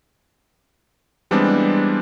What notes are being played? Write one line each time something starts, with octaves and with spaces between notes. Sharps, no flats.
E3 G3 G#3 B3 C4 D4